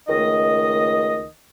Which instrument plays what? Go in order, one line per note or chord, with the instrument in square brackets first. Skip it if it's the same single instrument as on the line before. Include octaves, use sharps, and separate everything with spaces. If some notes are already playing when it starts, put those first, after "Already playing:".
[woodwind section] C#2 D#3 A3 D#5